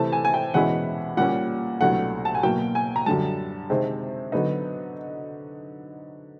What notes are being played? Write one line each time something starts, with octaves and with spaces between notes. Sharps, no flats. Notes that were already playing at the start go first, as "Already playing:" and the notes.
Already playing: C3 E3 A3 A5
G#5
G#5
G5
E2 B2 G#3 C#4 E4 F#5
A#2 G3 A#3 C#4 F#5
C2 B2 F#3 A3 D4 F#5
A5
G#5
B2 F#3 A#3 G5
G#5
A#5
F#2 D3 G3 A5
C3 D#3 G#3 C4
D3 F#3 B3 D#4